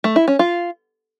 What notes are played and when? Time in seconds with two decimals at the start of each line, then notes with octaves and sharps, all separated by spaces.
0.04 A3
0.16 E4
0.28 C#4
0.39 F4